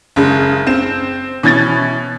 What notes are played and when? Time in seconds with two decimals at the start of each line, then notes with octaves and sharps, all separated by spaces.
0.16 F#1 C#3 G#3
0.67 C4 E7
1.43 B2 E3 C#4 G#6 A6